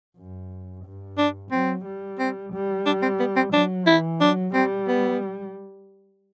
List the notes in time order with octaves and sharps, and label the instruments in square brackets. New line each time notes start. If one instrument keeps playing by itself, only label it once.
[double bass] F#2
G2
[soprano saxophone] D4
[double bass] F#3 [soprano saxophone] C4
[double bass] G3
[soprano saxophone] C4
[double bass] G3
[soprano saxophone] D4
C4
B3
C4
[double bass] F#3 [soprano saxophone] D4
[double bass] E3 [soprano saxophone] E4
[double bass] F#3 [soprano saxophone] D4
[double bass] G3 [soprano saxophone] C4
[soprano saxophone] B3